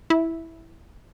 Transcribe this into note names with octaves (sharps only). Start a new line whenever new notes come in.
E4